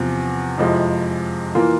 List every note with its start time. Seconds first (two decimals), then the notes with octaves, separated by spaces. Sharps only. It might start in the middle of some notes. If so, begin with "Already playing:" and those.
Already playing: E2 C3 F3
0.58 F2 C3 F3 G#3 E4
1.55 E3 A#3 F4